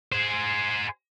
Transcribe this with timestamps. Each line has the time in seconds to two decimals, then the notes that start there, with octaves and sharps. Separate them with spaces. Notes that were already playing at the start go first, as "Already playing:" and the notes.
0.12 G#4 C5